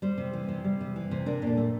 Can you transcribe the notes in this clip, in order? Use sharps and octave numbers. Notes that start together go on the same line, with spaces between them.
G3 C5
C3
E3
C3
G3
C3
E3
C3
D4 A#4
A#2 A4
A3